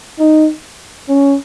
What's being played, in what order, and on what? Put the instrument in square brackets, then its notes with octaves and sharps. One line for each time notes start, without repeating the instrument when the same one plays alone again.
[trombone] D#4
C#4